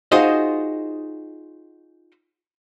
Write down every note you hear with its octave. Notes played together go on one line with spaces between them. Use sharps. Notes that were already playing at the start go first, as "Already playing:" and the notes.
D#4 F4 F#4 G#4 C5 D#5